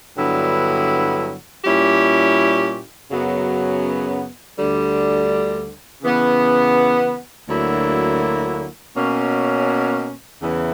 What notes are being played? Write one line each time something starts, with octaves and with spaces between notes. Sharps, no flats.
G2 D3 F#3 B3 E4
A#2 G3 C#4 E4 G4
F#2 C#3 F#3 B3
D2 D3 G3
C#3 E3 B3
D2 D3 F#3 A#3 E4
B2 A#3 C#4
E2 C#3 E3